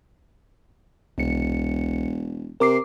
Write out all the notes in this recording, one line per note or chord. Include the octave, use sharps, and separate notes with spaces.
E1 C2 C#7
C3 A#4 D6 C7